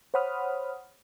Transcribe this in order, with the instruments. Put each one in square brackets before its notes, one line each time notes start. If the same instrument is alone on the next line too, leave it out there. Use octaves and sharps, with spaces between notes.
[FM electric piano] C5 C#5 F#5 B5 D#6 F6